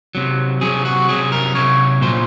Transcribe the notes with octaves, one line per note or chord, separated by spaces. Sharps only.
C3 F#3
C3 F#3 G#4
F#4
C3 F#3 G#4
A#4
C3 F#3 C#5
A#2 F#3 C5